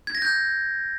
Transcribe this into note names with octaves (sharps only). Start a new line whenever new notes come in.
G#6
A#6
G6